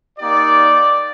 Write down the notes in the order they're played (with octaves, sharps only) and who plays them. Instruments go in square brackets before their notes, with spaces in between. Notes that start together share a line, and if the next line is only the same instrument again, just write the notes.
[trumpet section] A#3 D#4 G4 D5